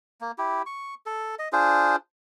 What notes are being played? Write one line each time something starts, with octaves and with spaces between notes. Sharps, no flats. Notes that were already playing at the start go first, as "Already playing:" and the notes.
A#3
E4 G4
C#6
A4
D#5
D4 F4 G#4 C5